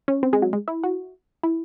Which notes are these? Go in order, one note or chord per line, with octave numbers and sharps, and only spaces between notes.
C#4
C4
G#3
F#3
G#3
E4
F#4
E4